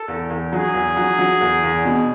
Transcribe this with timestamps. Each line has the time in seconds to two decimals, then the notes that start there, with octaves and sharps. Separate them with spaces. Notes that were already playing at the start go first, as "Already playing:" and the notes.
Already playing: A4
0.08 E2
0.30 E2
0.52 F#3 G#4
0.74 E2
0.97 F#3
1.18 F#3
1.41 E2
1.63 E2
1.85 B2